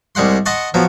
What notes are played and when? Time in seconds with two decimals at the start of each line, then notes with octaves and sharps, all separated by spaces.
0.15 C2 G3 G#3 F#5 C6
0.46 D#5 F#5 A5 C6 C#6
0.74 F3 F#3 B3